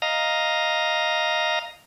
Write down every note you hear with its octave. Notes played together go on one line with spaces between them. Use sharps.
D#5 F5 A#5